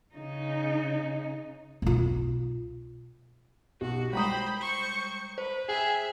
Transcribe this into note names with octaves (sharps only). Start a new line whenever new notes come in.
C#3 D#4
B1 F4
B1 F#4 G4
G3 G#3 C5 G5 A#5 B5 D#6
C5 C#6
B4 C5
G#4 E5 G5